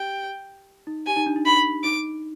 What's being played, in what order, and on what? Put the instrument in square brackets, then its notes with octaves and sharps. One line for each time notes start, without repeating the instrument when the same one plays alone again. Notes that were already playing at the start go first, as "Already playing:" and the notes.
Already playing: [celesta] G4 [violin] G5
[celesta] D#4
[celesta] G4 [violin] G#5
[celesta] D#4
D4
D#4
[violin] B5
[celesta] D#4 [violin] D6